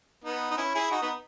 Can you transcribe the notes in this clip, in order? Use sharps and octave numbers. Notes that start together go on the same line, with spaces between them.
B3 D#4
D#4
C#4 E4
E4 G#4
D#4 F#4
B3 D#4